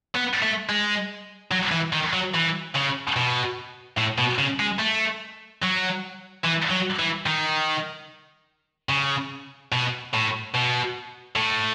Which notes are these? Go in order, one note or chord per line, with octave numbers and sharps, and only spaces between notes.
B3
A3
G#3
F#3
E3
D#3
F#3
E3
C#3
B2
A2
B2
C#3
G#3
A3
F#3
E3
F#3
E3
D#3
C#3
B2
A2
B2
A2